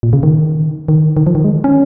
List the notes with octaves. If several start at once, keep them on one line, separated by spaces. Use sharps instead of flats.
A#2
C#3
D#3
D#3
D#3
F3
D#3
G#3
C#4